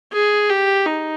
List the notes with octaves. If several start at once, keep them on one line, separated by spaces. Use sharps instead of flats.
G#4
G4
D#4